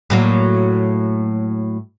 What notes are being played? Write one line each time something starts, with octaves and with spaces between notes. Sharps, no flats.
A2 F#3 A#3